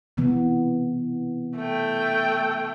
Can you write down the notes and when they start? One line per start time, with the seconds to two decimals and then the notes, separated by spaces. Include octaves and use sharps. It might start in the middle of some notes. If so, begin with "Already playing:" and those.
0.17 C3 E3 B3
1.58 A3 G5